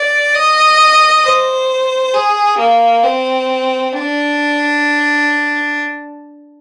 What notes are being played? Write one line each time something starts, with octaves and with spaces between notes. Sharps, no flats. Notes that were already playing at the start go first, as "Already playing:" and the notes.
Already playing: D5
D#5
C5
G#4
A#3
C4
D4